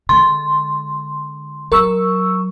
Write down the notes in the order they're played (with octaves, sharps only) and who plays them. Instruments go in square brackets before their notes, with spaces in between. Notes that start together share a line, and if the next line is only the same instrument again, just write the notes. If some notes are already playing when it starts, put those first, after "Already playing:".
[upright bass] D3 G#3 [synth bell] C6
[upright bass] F#3 [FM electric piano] A#4 C#6 E6